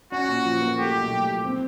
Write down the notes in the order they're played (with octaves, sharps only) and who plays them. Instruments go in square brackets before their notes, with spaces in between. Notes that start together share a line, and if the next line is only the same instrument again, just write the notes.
[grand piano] C#4 [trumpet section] F#4
[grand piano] A#2
F3
A#3
[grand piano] A3 [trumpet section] G4
[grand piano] B1
A2
F3
C4